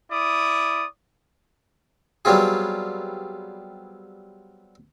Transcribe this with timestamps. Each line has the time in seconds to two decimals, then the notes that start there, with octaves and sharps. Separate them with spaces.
0.11 E4 D5 D#6
2.25 F#3 G3 B3 C4 F4 G#4